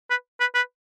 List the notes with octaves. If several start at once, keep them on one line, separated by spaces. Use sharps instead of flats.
B4
B4
B4